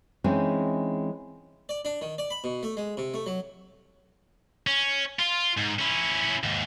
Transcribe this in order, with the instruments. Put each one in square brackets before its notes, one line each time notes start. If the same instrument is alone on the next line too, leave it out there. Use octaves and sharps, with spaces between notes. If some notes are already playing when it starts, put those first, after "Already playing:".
[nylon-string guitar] E3 G#3 C4 C#4 D#4
[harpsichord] D5
D4
D#3
D5
B5
B2
A3
G#3
C3
A3
F#3
[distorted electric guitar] C#4
F4
G#2
C#4 E4
D#2 G#2